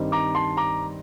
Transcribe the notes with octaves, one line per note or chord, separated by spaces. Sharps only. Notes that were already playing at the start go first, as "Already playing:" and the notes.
Already playing: G2 D#3 G3 C4 D#4
A#5 D6
A5 C6
A#5 D6